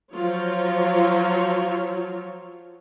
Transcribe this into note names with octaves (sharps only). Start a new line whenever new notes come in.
F3 F#3 F4 C#5